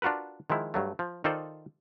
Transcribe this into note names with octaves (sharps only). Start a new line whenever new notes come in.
D4 F4 F#4 A#4 B4
D#3 F3 G#3 E4
G2 F#3 A3
F3
D#3 D#4 F4 A4 C5 D5